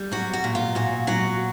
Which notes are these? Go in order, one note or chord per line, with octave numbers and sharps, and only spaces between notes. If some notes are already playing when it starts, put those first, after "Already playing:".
Already playing: G3
F#3 F#4
F#4
A#2
F4
A#2 F#4
F#3 F#4